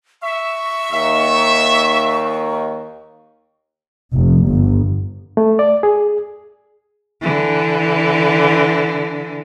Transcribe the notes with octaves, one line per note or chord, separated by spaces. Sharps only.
E5 C#6
D#2 A#3 D#4 E5
F1
G1
A3
D5
G#4
D3 E3